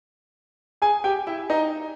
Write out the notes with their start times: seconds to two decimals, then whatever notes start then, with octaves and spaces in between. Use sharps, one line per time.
0.82 G#4 G#5
1.04 G4 G5
1.27 E4 E5
1.50 D#4 D#5